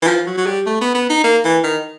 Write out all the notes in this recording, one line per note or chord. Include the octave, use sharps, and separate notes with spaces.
E3
F3
F#3
F#3
G3
A3
B3
B3
D#4
A#3
E3
D#3